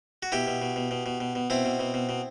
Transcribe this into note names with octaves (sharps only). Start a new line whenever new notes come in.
F#4
B2 E4 G4
B2
B2
B2
B2
B2
B2
B2
B2 C4 E4
B2
B2
B2
B2